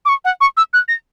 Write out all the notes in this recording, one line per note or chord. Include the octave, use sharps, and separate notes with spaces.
D6
C#6
F#5
C#6
E6
F#6
A#6